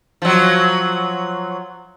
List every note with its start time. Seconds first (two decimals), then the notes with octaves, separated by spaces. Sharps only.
0.22 F3 F#3